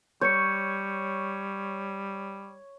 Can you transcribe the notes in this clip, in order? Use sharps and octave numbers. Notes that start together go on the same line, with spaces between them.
G3 C#5 G6 C#7